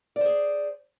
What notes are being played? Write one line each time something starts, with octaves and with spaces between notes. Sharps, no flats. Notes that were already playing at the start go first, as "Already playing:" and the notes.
G#4 C5 D5